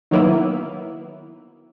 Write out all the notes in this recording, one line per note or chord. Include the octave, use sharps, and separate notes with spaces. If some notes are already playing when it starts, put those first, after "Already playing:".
D#3 F#3 A#3 B3 E4